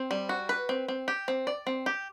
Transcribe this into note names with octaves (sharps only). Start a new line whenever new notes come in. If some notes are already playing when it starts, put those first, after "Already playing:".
Already playing: C4
G3
F#4
B4
C4
C4
G4
C4
D5
C4
G4